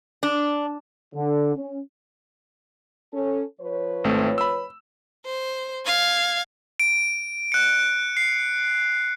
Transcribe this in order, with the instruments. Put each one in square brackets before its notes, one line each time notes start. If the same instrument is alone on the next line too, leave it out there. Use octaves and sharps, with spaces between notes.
[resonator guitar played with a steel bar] D4
[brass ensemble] D3
C#4
[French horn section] C#4 A4
F3 B4 C#5
[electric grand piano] G#1 A3 C4
B5 E6
[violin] C5
F5 G#6
[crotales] D7
F#6 C#7
C7